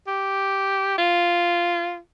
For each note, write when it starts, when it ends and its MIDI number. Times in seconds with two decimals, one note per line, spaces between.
0.08 0.96 67
0.98 1.98 65